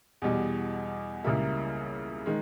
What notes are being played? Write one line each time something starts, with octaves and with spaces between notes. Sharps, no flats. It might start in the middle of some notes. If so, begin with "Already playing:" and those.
E2 B2 G3
C#2 C#3 G3 A#3 E4
D#3 G#3